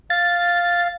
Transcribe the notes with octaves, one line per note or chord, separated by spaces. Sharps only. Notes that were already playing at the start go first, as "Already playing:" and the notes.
F5 A6